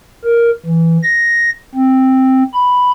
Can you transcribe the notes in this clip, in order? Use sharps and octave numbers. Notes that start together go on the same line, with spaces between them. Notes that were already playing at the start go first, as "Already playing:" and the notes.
A#4
E3
A#6
C4
B5